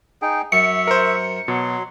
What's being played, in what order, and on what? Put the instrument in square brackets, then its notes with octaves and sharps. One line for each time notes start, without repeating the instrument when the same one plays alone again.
[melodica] D#4 G#4 G5
[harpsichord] F#2 [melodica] E5 C#6 [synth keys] C#7
[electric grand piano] A#4 C5
[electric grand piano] B2 [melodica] F#3 C6